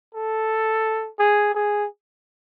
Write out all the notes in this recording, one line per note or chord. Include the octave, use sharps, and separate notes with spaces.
A4
G#4
G#4